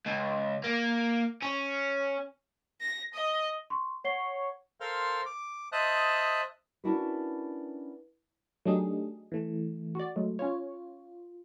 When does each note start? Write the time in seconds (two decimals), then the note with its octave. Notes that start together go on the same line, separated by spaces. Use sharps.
0.06 C#2
0.64 A#3
1.43 C#4
2.81 A#6
3.14 D#5
3.70 C6 C#6
4.04 C#5 F#5 C7 G7
4.80 A4 A#4 C5 F5 C6 F6
5.26 D6
5.72 C5 D#5 E5 A5 D#6 F#6
6.84 C#4 D4 E4 F#4 A#4 B4
8.65 F#3 A3 D4 D#4 G4 G#4
9.32 E3 A3
9.95 F#4 D5
10.16 F#3 G#3 A3
10.39 C#4 F4 C#5